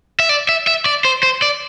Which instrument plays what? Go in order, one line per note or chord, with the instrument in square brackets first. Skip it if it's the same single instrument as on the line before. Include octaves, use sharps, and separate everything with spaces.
[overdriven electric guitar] E5
D5
E5
E5
D5
C5
C5
D5